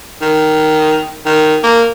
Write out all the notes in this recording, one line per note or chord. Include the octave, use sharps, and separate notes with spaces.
D#3
D#3
A#3